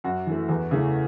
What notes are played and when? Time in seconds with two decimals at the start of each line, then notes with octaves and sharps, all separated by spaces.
0.04 F#2 F#4
0.26 E3 A3
0.49 E2
0.71 C#3 E3 A3